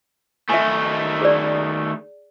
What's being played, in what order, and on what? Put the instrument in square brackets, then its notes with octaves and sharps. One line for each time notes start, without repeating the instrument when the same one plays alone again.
[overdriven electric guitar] D#3 A3 [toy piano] E5 G#5
[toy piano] G#4 D5